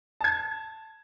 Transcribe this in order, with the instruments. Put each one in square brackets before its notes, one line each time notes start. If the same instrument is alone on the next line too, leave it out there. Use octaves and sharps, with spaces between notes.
[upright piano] A5 G#6